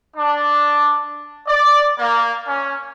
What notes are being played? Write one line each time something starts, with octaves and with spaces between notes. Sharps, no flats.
D4
D5
A#3
C#4